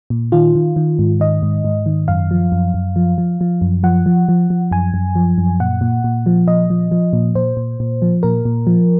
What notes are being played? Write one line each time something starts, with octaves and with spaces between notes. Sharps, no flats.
A#2
D#3 F4
D#3
D#3
G#2
D#3 D#5
G#2
G#2
D#3
F#2 F5
F3
F#2
F#2
F3
F3
F3
F#2
F3 F#5
F3
F3
F3
F#2 G#5
F#2
F3
F#2
A#2 F#5
A#2
A#2
F3
A#2 D#5
F3
F3
A#2
A#2 C5
A#2
A#2
F3
A#2 A#4
A#2
F3